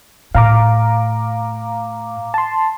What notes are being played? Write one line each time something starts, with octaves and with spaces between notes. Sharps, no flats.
A2 F5 A#5 D6
A5 C6